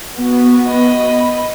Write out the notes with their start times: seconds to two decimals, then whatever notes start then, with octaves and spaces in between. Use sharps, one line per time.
0.20 B3 F#4
0.68 D#5 B5